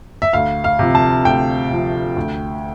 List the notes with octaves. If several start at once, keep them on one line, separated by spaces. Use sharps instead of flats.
E5
D2 F5
F5
C3 F3
A5
D2 G5
C3 F3
D2